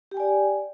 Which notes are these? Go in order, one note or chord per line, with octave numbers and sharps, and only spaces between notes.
G4 D5 G5 G#5